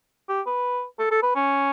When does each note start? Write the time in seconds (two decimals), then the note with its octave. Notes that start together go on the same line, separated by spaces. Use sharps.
0.29 G4
0.46 B4
0.99 A4
1.11 A4
1.23 B4
1.35 C#4